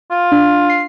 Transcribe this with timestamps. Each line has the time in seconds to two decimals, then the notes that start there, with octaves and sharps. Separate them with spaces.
0.11 F4
0.32 D4
0.69 C7